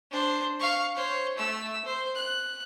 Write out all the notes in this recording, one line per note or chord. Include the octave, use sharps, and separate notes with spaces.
D4 C5
F5 C#6
C5 C#5
A3 E6
C5
F#6